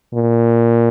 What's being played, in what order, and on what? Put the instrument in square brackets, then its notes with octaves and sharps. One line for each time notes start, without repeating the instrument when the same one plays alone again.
[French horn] A#2